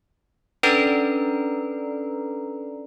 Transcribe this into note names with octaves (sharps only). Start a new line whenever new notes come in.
C#4 D4 A4 B4 D5 A#5